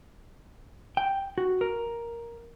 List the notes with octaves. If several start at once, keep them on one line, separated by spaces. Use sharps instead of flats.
G5
F#4
A#4